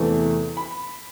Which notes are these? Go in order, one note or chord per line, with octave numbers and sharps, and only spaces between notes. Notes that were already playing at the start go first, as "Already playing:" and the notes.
Already playing: E2 C3 E3 A3
B5